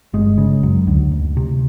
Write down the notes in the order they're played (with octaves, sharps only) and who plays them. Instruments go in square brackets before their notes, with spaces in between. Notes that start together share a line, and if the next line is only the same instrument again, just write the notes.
[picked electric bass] G1 G#3
C#3
F#2
D2
D2
C3